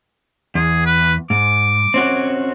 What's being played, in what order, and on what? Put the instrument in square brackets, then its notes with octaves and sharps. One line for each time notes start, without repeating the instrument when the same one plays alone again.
[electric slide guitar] E2 [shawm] G#4
[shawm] B4
[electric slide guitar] G#2 [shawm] D6
[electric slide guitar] C4 C#4 F#4